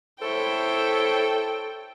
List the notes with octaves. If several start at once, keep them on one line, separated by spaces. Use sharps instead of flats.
E4 A4 C5 C#5 G5